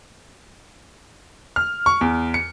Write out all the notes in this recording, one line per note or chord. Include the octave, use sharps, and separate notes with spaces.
F6
C#6
E2
C#7